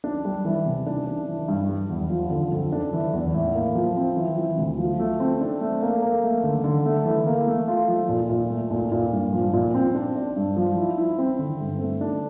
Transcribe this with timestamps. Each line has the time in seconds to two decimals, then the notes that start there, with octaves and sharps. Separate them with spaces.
0.04 D4
0.25 G3
0.45 E3
0.66 C3
0.86 D4
1.07 D4
1.28 E3
1.48 G2
1.69 G3
1.90 E2
2.10 F3
2.31 D3
2.52 F2
2.72 D4
2.93 E3
3.13 E2
3.34 A2
3.55 A#3
3.75 F3
3.96 C4
4.17 E3
4.38 E3
4.58 D2
4.79 F3
4.99 A3
5.20 C4
5.41 D4
5.61 A3
5.82 A#3
6.02 A#3
6.23 A3
6.44 D3
6.64 D3
6.85 A3
7.05 E3
7.26 A#3
7.47 A3
7.68 F4
7.88 F3
8.09 A#2
8.30 A#2
8.50 A3
8.71 A#2
8.92 A#2
9.12 G2
9.33 F3
9.53 A#2
9.74 C4
9.95 D4
10.15 D4
10.36 G2
10.56 F3
10.77 E4
10.98 E4
11.18 C4
11.39 D3
11.60 G2
11.80 A3
12.01 D4